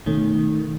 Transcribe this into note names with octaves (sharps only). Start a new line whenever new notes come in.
B2 D#3 A3 C#4